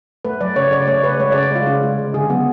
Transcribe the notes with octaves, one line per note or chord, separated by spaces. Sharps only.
A3 B4
F#3 D5
C#3 C#5
C#3 D5
A3 C#5
C#3 B4
G#3 C#5
C#3 D5
G#3 F4
C#3 F4
G#3
C#3
D3 G#4
F#3 B3